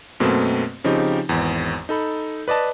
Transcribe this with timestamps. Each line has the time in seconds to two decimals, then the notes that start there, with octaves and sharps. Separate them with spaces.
0.20 F#2 B2 A3 A#3 C4
0.84 C#3 F3 C4 D#4 G4
1.29 G#1 E2
1.89 D#4 A4 B5
2.48 B4 D5 D#5 A5